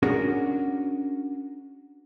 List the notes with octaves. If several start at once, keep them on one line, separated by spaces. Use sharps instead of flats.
C#4 D4 F#4 G#4 A#4